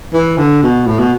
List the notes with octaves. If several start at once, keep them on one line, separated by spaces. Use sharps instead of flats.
E3
D3
B2
A2
B2